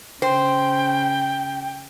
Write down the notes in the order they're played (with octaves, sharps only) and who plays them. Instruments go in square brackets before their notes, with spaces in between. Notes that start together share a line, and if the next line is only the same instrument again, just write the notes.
[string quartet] C#3 [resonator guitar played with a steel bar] C5 [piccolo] G5